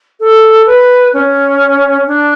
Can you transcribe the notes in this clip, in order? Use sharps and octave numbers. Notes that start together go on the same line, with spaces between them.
A4
B4
C#4
D4